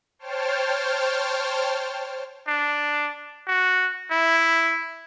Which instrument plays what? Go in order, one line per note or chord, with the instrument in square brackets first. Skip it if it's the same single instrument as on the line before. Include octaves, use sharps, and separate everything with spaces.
[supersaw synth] C5 C#5 G5 A5 F6
[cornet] D4
F#4
E4